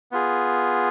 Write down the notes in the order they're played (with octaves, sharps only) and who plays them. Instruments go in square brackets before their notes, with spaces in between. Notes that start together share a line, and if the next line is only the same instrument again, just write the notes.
[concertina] B3 F4 G#4